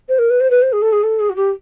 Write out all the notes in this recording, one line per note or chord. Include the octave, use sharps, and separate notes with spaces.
C5
A#4
B4
C5
B4
C5
G#4
A4
G#4
A4
G#4
F#4
G4